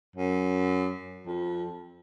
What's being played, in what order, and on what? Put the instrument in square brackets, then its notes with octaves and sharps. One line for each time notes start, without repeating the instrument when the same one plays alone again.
[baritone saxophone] F#2
F2